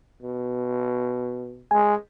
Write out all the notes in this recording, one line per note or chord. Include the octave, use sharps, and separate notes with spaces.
B2
G#3 G#5